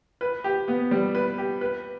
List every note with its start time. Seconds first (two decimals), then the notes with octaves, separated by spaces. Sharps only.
0.21 B4
0.44 G4
0.68 B3
0.91 G3
1.15 B4
1.38 G4
1.61 B4